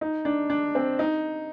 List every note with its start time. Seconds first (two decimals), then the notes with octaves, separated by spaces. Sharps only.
0.01 D#4
0.25 D4
0.50 D4
0.75 C4
0.99 D#4